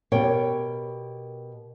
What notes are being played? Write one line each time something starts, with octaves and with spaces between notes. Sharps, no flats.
B2 G4 A#4 C#5 G5